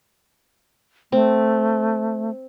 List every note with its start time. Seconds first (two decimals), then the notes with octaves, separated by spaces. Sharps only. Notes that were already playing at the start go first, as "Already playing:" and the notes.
1.12 A3 C4